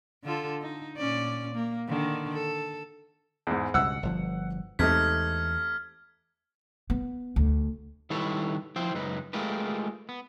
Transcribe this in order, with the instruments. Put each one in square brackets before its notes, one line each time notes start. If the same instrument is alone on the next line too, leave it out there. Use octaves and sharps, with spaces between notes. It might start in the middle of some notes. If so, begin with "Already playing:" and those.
[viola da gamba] D3 F4 A4
D#4
A#2 C#4 D5
A#3
D3 D#3
A4
[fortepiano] E2 G#2
[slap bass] C#2 G2 B2 [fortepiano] F#5 E6 F#6
[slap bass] G1 B2 F3
[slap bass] E2 G#3 [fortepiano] C3 A3 D#4 [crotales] F6 G#6 B6
[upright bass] B3
D2
[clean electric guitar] D#3 G3 E4 A4 B4 C#5
F3 E4 C5 G5
C#2 F#2 D#4 B4
G#3 A3 F4 G4 A#4 B4
B3